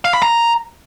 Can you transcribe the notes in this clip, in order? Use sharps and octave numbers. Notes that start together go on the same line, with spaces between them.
F5
B5
A#5